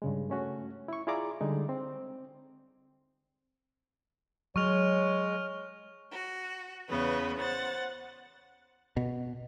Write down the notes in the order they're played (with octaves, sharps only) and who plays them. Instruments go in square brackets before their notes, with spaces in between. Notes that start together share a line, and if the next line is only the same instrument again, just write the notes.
[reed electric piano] G2 C#3 G#3
A3 C#4 F#4
E4 C#6
E4 F4 G#4 D5 A#5 D6
D3 G3 G#3 D#4
C4
[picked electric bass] F#3 [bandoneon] G#3 [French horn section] C#5 [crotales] C#6 F6 F7
[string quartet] F#4
E2 C#3 B3 B4
C5 F#5 A6
[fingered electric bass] B2